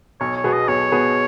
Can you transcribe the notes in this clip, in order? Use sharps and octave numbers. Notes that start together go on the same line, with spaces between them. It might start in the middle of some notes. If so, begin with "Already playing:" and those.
B1 C#5
C#5
B2 B3 G#4
D#5
B1 C#5
B2 B3 G#4